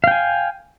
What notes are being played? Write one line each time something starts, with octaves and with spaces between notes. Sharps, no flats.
F5 G5 G#5